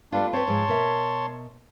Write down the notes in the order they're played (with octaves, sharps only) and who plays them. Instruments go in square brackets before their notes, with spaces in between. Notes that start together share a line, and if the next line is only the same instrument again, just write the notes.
[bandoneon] G3 D4 [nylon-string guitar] A3 B3 F4
[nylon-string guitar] C4 B4 [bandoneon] C#5 A5 C6
[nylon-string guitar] G#2 F3 G#3
B2 A#4 E5